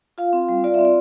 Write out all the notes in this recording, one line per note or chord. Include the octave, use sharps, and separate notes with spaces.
F4 F5
C4
G3
F4 D5
C4 E5
D5